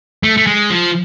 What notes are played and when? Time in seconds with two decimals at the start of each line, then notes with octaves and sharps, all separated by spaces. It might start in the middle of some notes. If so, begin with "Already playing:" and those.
0.23 A3
0.37 A3
0.47 G#3
0.70 F3